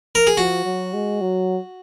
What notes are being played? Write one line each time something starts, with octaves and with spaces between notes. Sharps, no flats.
A#4
G#4
F3 F#4
F#3
G#3
F#3